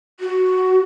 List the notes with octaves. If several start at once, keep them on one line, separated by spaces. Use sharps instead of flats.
F#4